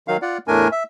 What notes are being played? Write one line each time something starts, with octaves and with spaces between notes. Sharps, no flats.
D#3 F#3 F5
F4 D5 F#5
E2 A2 A3 D4 A#4 G#5
E5